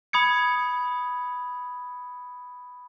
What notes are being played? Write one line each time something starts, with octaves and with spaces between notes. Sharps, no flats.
B5 D#6 G#6 C#7